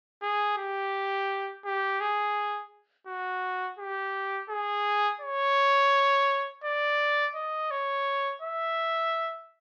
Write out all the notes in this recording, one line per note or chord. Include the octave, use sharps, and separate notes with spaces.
G#4
G4
G4
G#4
F#4
G4
G#4
C#5
D5
D#5
C#5
E5